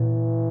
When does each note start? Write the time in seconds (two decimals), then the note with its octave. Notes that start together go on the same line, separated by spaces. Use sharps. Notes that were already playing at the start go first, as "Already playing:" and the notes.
Already playing: A#2 E3